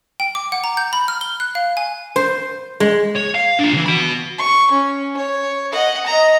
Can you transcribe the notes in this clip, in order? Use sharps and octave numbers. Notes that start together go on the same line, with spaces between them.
G5
D6
F#5
A#5
G6
B5
F6
G7
F#6
F5
G#5
C5
G#3
C#5
F5
D4 F4
C3 E3
F#4 B5
C#6
C#4
C#5
D#5 F#5
D#5 A#5